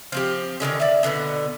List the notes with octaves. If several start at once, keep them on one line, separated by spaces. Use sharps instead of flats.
F3 C4 G4
D3 D#3 G#3 C#4
D5 E5
B2 D3 A#3 B3